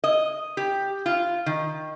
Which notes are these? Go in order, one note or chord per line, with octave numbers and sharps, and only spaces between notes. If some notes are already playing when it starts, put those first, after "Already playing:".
D#5
G4
F4
D#3